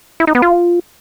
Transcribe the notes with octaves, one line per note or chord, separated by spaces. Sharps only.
E4
D#4
B3
F4